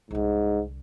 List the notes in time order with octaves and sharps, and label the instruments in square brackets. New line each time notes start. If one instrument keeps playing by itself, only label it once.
[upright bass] C2 D3 [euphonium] G#2